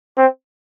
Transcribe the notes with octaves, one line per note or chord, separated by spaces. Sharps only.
C4